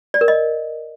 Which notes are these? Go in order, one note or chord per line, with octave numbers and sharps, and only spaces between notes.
D5
A#4
D#5